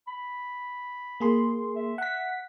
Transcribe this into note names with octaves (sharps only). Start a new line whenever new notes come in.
B5
A#3 G#4 C6
E5
F#5 B6